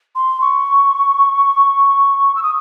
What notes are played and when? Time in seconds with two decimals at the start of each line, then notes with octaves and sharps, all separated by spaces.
0.15 C6
0.41 C#6
2.35 E6
2.43 D#6